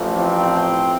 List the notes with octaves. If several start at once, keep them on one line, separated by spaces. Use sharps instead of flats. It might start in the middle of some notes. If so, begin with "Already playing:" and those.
Already playing: A1 A2 F3
C4